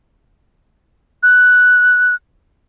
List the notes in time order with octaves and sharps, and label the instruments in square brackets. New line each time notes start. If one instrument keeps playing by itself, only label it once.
[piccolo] F#6